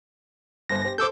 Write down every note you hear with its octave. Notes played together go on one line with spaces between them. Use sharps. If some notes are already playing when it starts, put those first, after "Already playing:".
G1 G2 C5 A#6
G4 C5
A4 C5 D6 E6 G6